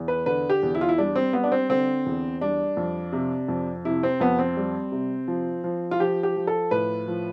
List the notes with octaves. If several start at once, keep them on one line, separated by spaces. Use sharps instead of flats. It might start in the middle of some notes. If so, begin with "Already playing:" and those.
Already playing: E2
B4
D3 B4
G4
E2
E4
F4
E4
G3 D4
C4
G3 B3
D4
C4
D3 C4
E2
G3 D4
F2
C3
F2
C3 E4
C4
F2 B3
C4
G3
C3
F3
F3
F4
F3 G4
G4
F3
A4
A2 B4
F3